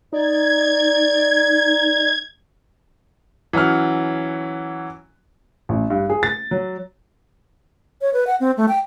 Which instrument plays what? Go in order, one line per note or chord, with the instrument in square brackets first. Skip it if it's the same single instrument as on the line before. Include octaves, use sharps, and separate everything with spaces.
[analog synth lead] D#4 [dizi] D5 [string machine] G#6
[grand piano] E3 F#3 C#4 F#5 F6
[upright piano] A1
G2
G#4
A6
F#3
[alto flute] C#5
B4
F#5
C4
A3
G5